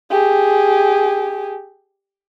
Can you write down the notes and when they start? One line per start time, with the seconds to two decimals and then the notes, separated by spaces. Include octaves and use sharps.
0.10 G4 G#4